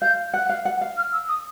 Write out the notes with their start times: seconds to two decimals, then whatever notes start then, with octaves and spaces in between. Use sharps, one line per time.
0.02 F5 G6
0.34 F#5 F#6
0.49 F5
0.65 F#5
0.81 F5
0.97 F6
1.13 E6
1.29 D#6